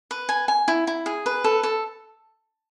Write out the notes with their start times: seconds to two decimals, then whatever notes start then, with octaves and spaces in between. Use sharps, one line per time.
0.11 B4
0.29 G#5
0.48 G#5
0.68 E4
0.87 E4
1.06 G#4
1.26 B4
1.44 A4
1.63 A4